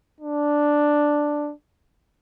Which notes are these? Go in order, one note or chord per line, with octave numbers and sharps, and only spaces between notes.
D4